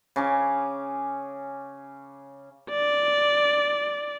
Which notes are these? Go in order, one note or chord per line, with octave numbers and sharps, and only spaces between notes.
C#3 C#4 D6
D5